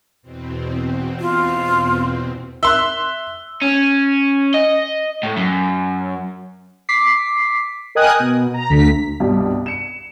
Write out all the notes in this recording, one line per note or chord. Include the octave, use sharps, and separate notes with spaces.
E2 B2 C4
F4
E5 C6 E6 F#6 G7
C#4
D#5
A2
F#2
D6 B6 C7
A#4 D#5 G5 G#5 D#6 F#6
B2
A#5
D2 D3 B6
C2 G2 B2 G3
C#7 E7